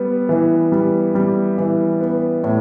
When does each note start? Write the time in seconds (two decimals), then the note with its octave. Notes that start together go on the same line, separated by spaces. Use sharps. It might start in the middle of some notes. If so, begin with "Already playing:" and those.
Already playing: G3 B3
0.29 E3
0.72 G3
1.15 G3
1.58 E3
2.01 B3
2.44 A2